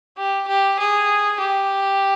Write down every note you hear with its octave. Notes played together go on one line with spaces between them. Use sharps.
G4
G4
G#4
G4